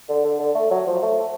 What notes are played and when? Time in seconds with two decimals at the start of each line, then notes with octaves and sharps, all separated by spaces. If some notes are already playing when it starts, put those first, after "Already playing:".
0.09 D3
0.24 D3
0.39 D3
0.55 A3
0.71 F#3
0.87 F3
1.03 A3